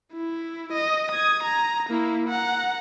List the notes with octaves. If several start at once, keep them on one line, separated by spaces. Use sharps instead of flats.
E4
D#5
D#6 G#6
A#5
A#3 E4
F#5 A#5